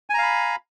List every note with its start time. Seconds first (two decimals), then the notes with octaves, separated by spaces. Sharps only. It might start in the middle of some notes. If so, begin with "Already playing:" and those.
0.10 G#5
0.14 A#5
0.18 F5
0.23 B5